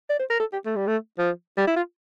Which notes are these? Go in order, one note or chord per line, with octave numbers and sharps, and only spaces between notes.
D5
C5
A#4
A4
G4
A3
G3
A3
F3
G3
E4
F4